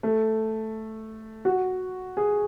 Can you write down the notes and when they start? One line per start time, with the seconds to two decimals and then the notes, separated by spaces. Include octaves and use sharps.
0.03 A3
1.45 F#4
2.17 G#4